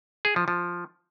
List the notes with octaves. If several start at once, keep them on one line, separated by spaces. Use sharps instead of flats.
G#4
F3
F3